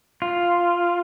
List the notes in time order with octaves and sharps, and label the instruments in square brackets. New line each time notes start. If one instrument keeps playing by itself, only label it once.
[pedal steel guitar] F4